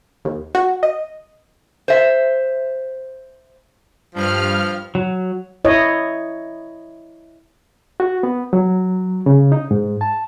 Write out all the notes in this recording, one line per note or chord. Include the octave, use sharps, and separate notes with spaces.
D#2
F#4
D#5
C5 E5
G2 F3 F6
F#3
E4 C#5 D#5
F#4
B3
F#3
C#3
D#4
G#2
A5